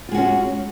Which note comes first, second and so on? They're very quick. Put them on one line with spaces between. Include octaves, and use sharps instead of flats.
F4 G#3 F#4 C#4